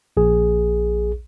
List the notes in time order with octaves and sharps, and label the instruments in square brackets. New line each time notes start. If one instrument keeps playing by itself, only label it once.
[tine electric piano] A#1 G#4